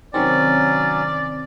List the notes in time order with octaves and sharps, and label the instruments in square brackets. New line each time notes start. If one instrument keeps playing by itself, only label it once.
[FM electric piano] C3 D#3 C4 [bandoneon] F#3 C#4 [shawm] D5